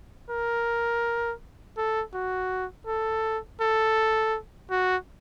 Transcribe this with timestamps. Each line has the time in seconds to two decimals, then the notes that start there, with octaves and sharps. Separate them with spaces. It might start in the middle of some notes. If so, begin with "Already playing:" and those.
0.30 A#4
1.77 A4
2.14 F#4
2.87 A4
3.61 A4
4.70 F#4